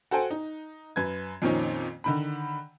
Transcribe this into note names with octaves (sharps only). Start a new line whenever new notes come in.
F#4 A4 C5 G5 G#5
D#4
F#2 B4 G#6
F2 A#2 D#3 C4 C#4 D#4
D3 D#3 B5